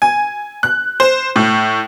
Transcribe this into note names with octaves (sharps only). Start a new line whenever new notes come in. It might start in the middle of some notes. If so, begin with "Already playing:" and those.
G#5
F#6
C5
A2